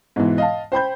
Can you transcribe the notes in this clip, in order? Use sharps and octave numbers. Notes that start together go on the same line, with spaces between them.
G#2 B2 E3
D#5 F5 A5
C5 G5 B5 G6